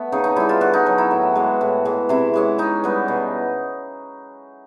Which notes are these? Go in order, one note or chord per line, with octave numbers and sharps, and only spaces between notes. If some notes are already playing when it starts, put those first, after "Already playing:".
Already playing: A3 B3
C#3 D#4
D#4
E3 G3 E4
F4
D3 F#4
D#4
F#3 B3
E4
A2
E3 G#3
A2
E3 G#3
C3 E4
E3 G#3 C#4
E3 D#4
G3 B3
B2